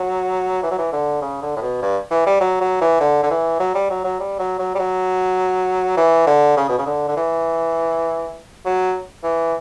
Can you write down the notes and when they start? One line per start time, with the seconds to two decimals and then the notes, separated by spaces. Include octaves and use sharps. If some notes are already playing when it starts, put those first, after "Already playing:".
Already playing: F#3
0.63 E3
0.71 F#3
0.78 E3
0.92 D3
1.21 C#3
1.42 D3
1.56 A2
1.62 B2
1.82 G2
2.11 E3
2.26 G3
2.40 F#3
2.61 F#3
2.81 E3
3.00 D3
3.23 D3
3.30 E3
3.59 F#3
3.74 G3
3.90 F#3
4.04 F#3
4.20 G3
4.39 F#3
4.59 F#3
4.74 G3
4.79 F#3
5.97 E3
6.27 D3
6.57 C#3
6.69 B2
6.78 C#3
6.86 D3
7.08 D3
7.17 E3
8.65 F#3
9.24 E3